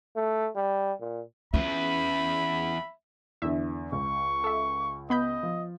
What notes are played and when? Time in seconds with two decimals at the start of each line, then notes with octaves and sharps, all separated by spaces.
0.16 A3
0.56 G3
1.00 A#2
1.54 E2 C#4 F4 B4 E5 B5
3.42 E2 D3 E5
3.92 C#2 C#6
4.44 A4 E5
5.10 B3 D#5 B5 G6
5.43 F3